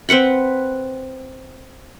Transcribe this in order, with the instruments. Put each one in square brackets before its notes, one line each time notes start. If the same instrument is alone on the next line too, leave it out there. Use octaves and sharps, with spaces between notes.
[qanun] C4 B4 F#5 B5